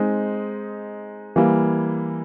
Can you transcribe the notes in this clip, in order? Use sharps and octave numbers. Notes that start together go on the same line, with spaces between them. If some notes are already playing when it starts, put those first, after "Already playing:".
Already playing: G#3 C4 D#4
E3 G3 A#3